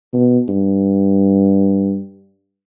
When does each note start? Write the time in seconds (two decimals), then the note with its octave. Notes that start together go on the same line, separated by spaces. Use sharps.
0.13 B2
0.49 G2